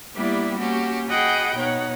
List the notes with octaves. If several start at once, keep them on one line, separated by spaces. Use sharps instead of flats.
G3 A#3 B3 D4 E4 G4
A#3 C#4 F#4 G4
F#4 G#4 D#5 F#5 G5 B5
B2 D#4 C#5 F#5